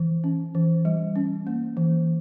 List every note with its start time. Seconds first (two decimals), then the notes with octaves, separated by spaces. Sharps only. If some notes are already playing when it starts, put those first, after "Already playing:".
Already playing: E3
0.24 C#4
0.55 E3
0.85 G3
1.16 C#4
1.47 A#3
1.77 E3